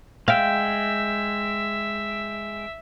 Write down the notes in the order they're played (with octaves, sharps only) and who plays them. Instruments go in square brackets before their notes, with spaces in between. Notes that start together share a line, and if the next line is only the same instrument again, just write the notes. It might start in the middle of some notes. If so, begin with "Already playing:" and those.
[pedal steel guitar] G#3 G5 [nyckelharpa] E5 [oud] F5